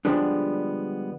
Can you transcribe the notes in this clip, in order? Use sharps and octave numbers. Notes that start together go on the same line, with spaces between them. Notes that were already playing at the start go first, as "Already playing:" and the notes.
D3 F3 G3 G#3 B3 D4